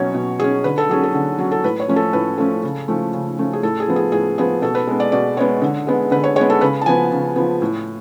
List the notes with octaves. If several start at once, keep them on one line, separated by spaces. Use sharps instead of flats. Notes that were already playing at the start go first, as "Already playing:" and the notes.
Already playing: B2 F#3 C#4 C#5
B2
F#3 C#4 G#4
D3 B4
A4
F#3 C#4 G#4
A4
D3
F#3
C#4
A4
A2 B4
C#5
F3 A3 C#4
A4
A2 B4
F3 A3 C#4 A4
C#3
F3 A3 C#4
C#3
F3 A3 C#4
G#4
A2 A4
G#4
F3 B3
G#4
A2 G#4
F3 B3 G#4
B2 A4
B4
G#3 B3
D5
B2 D5
G#3 B3 C#5
D3
G#3 B3
D3 B4
C#5
G#3 B3 C#5
A4
C#3 B4
A5
F3 B3 G#5
C#3
F3 B3
A2